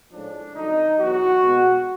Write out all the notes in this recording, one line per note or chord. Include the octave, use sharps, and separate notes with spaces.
A2 F3 G#3 C#4 D4
F2 D3 F#3 D#4
E2 B2 F#3 F#4
B2 G#3 B3